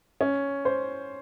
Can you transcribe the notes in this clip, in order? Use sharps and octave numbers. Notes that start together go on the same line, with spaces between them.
C#4
C5